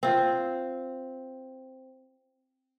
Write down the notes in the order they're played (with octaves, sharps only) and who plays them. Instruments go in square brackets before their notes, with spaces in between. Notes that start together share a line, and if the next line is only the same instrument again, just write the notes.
[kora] C4 F4